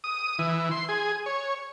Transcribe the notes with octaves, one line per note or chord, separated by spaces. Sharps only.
D#6
E3
C6
G#4
C#5